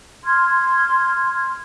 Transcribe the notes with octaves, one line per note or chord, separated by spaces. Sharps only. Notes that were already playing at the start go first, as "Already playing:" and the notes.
C6 F6 G#6